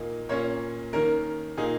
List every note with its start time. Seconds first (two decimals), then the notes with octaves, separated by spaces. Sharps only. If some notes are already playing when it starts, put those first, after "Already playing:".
Already playing: A#2 A#3 D#4
0.29 A#2 A#3 C#4 C#5
0.93 D#3 A#3 C#4 A#4
1.58 A#2 A#3 D#4 G#4